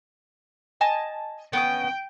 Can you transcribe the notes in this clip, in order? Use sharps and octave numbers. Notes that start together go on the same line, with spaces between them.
D#5 G#5 A5
B3 C#4 D#5 G5